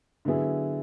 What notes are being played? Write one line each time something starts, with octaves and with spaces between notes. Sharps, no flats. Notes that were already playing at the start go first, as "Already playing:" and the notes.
D3 F#3 B3 E4 G#4